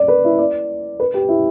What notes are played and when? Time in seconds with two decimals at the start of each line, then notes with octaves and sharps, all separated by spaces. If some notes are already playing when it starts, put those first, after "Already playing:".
Already playing: D5
0.08 B4
0.24 E4
0.39 D5
1.00 B4
1.14 G4
1.29 E4